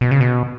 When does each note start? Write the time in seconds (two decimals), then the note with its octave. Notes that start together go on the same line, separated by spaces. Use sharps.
0.01 B2
0.11 C#3
0.20 B2